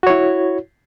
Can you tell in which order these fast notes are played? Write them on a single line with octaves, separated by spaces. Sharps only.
F#4 C#5 E4